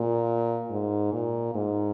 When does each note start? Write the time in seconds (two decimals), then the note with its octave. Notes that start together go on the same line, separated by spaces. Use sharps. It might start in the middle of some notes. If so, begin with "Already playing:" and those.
Already playing: A#2
0.70 G#2
1.13 A#2
1.54 G#2